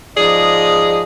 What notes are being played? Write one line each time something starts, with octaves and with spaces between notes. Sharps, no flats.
G#2 F3 G#4 D5 D#5